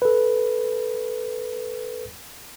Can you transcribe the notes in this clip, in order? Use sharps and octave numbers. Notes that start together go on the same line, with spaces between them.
A4 B4